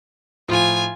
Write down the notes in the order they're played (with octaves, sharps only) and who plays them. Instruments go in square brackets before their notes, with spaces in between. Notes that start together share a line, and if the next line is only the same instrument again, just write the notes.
[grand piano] A2 F3 [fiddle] F4 G#5